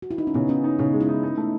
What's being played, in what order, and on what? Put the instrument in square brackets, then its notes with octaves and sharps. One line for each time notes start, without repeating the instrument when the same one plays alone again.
[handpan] F#4
E4
D#4
C#4
[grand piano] C#3 [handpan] B3
[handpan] C#4 [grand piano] D#4
[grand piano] D#4
[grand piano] C#3 [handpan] D#4
[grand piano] G#3
[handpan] E4
[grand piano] D#4
D#4
A3